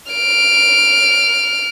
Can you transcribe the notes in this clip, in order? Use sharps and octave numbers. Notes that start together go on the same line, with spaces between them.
F6 D7